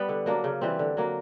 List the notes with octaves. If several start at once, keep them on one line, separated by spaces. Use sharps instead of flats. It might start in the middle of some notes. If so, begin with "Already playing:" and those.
Already playing: G3 B3
D3
F#3 A#3 D4
C#3
E3 G3 C4
D3
F#3 A#3